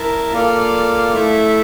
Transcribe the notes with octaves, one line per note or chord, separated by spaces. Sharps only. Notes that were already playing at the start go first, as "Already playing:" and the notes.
Already playing: E4 A#4 E5 A5
A#3 F4 A4 D5 F5
A3 E4 A4 E5